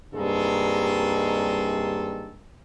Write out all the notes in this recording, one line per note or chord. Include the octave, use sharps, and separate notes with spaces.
C2 G2 D#3 G#3 A#3 A4